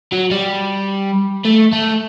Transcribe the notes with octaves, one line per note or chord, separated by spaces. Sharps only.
F#3
G3
A3
A3